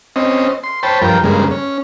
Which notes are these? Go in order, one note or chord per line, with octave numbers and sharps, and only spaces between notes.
C4 C#4 D#5
C6
C5 C#5 G5 A5 B5
G2 F3 A#4 G5
G2 C#3 G#3 A#3
C#4